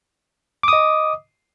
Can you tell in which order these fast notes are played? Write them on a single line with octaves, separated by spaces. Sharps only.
D6 D#6 D#5